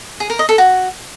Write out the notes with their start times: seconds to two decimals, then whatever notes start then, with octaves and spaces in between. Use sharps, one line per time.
0.20 G#4
0.30 A#4
0.39 D#5
0.49 A4
0.58 F#4